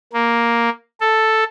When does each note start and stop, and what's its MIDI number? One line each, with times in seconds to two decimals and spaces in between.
0.13 0.70 58
1.01 1.44 69